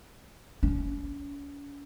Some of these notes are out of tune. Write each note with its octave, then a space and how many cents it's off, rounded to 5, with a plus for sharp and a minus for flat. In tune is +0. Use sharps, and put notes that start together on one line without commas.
C#4 +40